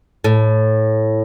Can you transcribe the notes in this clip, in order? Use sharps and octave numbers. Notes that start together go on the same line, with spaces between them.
A2